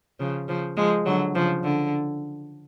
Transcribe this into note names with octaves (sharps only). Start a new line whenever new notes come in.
C#3 F3
C#3 F3
F3 G#3
D3 F#3
C#3 F3
D3